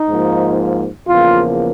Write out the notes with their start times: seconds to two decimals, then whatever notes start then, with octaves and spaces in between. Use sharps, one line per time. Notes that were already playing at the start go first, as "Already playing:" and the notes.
Already playing: D#4
0.09 G#2 F3 A#3
1.08 E2 C#3 F3 A#3 F4